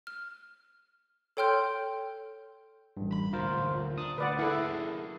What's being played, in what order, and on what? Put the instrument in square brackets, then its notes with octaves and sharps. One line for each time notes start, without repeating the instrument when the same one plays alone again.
[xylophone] F6
A4 C#5 G5 C6 F6 G6
[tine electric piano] A1 G2
[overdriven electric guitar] B5
[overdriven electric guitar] D2 A#2 [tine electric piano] F4 A#4 C5
[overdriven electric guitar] D4 [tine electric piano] D#6
[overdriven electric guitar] D2 [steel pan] B4 D5 F#5
[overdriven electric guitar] A#3 G#4 [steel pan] E4 A4